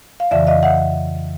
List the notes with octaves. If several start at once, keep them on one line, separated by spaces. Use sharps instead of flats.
F5
F2 C#3 E3 D5 E5
D#5 F5
E5 F#5